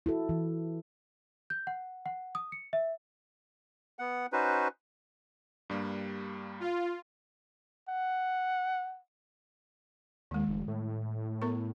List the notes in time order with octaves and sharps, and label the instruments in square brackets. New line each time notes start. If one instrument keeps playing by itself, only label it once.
[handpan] E4 F#4 A4
E3
[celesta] G6
F#5
F#5
D#6
C#7
E5
[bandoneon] B3 F#5
C#4 D#4 F#4 B4 C5
[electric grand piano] G2 G3 A#3
[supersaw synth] F4
[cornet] F#5
[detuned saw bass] D#2 [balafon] D#3 G#3
[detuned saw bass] F1
A2
[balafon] B3 A#4 C#6